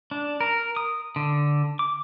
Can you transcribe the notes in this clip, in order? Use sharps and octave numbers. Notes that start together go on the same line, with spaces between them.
D4
A#4
D#6
D3
D6